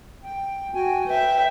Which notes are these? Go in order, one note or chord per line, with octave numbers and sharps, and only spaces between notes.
G5
F#4 G5 G#5
B4 E5 G5